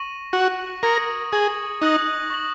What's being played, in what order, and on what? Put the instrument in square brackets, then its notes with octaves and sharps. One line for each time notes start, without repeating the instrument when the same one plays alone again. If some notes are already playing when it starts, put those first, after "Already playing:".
Already playing: [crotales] C#6 A#6 D#7 F#7
[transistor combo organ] F#4 [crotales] C#6 A#6 F#7
[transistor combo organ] A#4 [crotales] D#6 G#6 C#7 F#7
[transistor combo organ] G#4 [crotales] C#6 G#6 F#7
[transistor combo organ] D#4 [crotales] D#6 F#6 A#6 F#7
[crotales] C#6 A#6 F#7